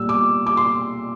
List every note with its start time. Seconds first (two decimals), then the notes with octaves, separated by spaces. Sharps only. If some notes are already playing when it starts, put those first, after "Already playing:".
Already playing: A#2 G3 E6
0.09 D6
0.46 D6
0.57 C6